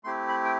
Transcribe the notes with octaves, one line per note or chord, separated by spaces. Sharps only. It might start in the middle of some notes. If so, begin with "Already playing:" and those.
A3 C4 E4 G4 C6
B5
G5